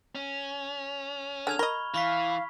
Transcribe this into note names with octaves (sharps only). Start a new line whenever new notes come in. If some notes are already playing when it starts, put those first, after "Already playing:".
C#4
D3 G#4 F6 G#6 F7
A#4 D#5 B5 C#6 G7
E3 F5 B5 C#6 B6